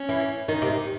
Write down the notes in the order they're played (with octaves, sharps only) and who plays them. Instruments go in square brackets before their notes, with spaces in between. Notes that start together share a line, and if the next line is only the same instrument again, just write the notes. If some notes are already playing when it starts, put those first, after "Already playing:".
Already playing: [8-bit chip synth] C#4
[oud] E3
[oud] D#3 [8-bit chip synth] D#4
[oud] C3